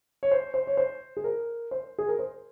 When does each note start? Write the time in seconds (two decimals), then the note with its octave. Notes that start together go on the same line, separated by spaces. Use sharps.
0.23 C#5
0.31 C5
0.54 C5
0.67 C#5
0.77 C5
1.17 G#4
1.24 A#4
1.71 C5
1.99 G#4
2.08 A#4
2.19 C5